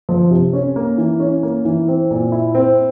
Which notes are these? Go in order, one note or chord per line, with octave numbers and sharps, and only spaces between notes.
F3
C3
C#4
A#3
E3
C#4
A#3
E3
C4
A#2
E4
C4